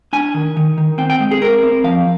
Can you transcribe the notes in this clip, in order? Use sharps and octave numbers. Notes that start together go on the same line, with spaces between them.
D4 G#5
D#3
D#3
D#3
C4 G5
G5
G#3
G#4
C4 A#4
C4
F3 F5